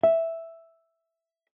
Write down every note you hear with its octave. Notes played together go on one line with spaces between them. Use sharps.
E5